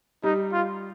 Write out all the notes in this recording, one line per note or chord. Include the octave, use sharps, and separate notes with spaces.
G3 D#4
F4